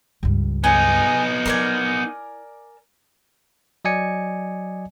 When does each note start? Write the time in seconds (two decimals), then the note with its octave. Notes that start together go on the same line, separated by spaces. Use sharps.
0.23 C#2 G2
0.64 B3 D#4 G#4
1.46 E4 A#4 D5 G#5
3.85 F#3 D5 D#5 G#5 C#7